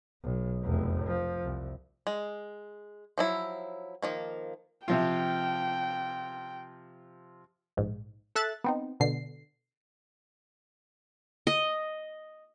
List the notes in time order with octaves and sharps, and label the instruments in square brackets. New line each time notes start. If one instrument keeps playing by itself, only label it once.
[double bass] B1
F1 E2
F3
C2
[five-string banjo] G#3
F3 F#3 E4
D#3 F3 A#3
[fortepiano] C3 F3 F4 [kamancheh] G5
[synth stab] A#1 G#2
A4 E5 F#6 A6
B3 C4 D#4
B2 D3 C7
[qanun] D#5